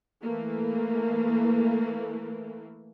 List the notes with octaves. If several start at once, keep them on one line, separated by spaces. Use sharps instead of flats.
E3 A3 A#3